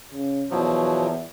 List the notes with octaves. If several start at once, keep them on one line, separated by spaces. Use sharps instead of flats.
C#3
E2 B2 F3 F#3